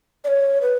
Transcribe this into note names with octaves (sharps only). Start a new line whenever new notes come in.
D5
C#5
B4